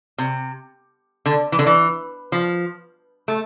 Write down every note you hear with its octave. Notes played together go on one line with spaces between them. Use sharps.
C3
D3
E3
D3
E3
F3
A3